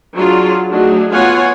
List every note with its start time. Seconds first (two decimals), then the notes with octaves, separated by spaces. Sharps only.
0.15 F#3 D4 F4 G#4
0.70 F#3 A3 D4 D#4 F#4 G#4
1.11 B3 F4 C#5 F#5 G#5